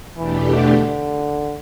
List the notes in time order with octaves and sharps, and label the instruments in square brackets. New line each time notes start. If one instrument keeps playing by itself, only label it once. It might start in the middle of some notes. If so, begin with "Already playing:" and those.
[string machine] E2 B2 A3 D4 G4 [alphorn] E3
[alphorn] D3